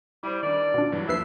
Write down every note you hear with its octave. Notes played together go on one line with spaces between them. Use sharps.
G3 E4 C5
D#3 D4 D5
B2 D4 F4
G2 E3 F#3
D#2 F3 B4 E5 C7